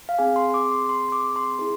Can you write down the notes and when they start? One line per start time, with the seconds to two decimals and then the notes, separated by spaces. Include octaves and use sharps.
0.09 F5
0.19 C4 G#4 G#5
0.36 C6
0.54 D6
0.71 C6
0.89 C6
1.12 D6
1.36 C6
1.59 E4 G#4